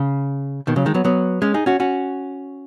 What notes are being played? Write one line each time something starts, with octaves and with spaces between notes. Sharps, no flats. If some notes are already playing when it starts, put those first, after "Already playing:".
Already playing: C#3
B2 D#3
C#3 F#3
D#3 G#3
F#3 B3
F#3 B3
G#3 C#4
D#4 G#4
C#4 F#4
C#4 F#4